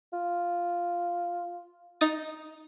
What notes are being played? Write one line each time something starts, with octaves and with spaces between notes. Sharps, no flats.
F4
D#4 D#6 A6